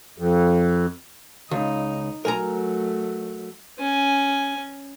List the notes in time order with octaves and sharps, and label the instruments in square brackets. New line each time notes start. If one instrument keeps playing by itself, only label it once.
[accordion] F2
[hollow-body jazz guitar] C#2 [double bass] D#4
[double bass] F#3 A3 [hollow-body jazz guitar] A#4 G#5 A#5
[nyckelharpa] C#4 G#5